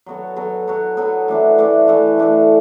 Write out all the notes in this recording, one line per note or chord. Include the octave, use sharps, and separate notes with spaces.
F#3 B3 F#4 A4
F#3 B3 F#4 A4
F#3 B3 F#4 A4
F#3 B3 F#4 A4
E3 A3 D4 A4
E3 A3 D4 A4
E3 A3 D4 A4
E3 A3 D4 A4